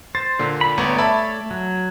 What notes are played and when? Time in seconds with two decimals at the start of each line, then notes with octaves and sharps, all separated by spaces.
0.15 C5 A6
0.39 A#2 D3
0.61 B5
0.78 G1 A3 B3 C#5 D5 A#5
0.98 E5 A5 B5
1.51 F#3